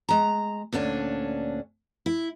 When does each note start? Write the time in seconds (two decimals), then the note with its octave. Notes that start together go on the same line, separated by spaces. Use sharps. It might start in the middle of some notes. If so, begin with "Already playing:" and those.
0.09 G#3 A#5
0.72 D2 A#2 C#4 D4
2.06 E4